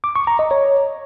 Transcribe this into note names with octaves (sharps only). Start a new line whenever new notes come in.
D6
C#6
A#5
D#5
C#5